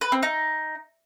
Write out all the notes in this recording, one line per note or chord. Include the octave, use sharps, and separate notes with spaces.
B4
C4
D#4